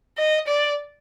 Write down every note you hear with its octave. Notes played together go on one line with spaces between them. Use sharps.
D#5
D5